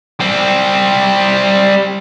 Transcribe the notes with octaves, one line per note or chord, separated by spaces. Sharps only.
G3 C4